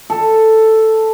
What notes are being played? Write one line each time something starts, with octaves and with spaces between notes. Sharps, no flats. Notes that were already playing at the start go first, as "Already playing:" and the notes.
A4